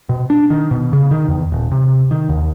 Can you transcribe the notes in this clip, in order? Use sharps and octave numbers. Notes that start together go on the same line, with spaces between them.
B2
D4
D#3
B2
C#3
D#3
E2
D#1
C3
D#3
D#2